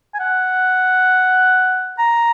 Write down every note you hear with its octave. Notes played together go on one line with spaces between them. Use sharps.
G#5
F#5
A#5